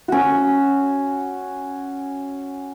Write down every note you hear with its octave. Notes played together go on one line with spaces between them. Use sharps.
C#4 F#4